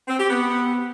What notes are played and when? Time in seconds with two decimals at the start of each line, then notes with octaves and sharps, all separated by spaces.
0.08 C4
0.19 G4
0.30 B3